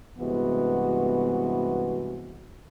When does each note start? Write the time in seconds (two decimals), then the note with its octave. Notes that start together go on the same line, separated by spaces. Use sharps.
0.19 G2 C3 E3 G#3 B3 F#4